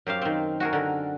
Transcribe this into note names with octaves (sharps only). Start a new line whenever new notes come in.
F#2 G4 C5 F5
D#3 C4
F#4 G#4 A#4
D3 A#4